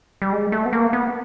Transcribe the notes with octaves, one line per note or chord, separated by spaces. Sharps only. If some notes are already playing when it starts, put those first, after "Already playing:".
G3
G#3
A3
B3
A#3
B3